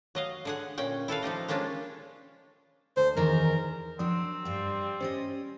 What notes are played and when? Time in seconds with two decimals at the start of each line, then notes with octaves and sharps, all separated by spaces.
0.15 F#3 D#5 F5
0.45 D3 G#4 F#5
0.78 A#2 C#4 G5
1.08 E4 A4 B4 F5
1.22 F3 D#4 G4 D#5
1.48 G#3 A#3 C#4 D4 F4 G4
2.97 D2 C5
3.17 E2 D#3 A#4
3.99 F3 F#3 C4 D4
4.45 G2 G3 F5
5.00 C#4 G4 C5 D#5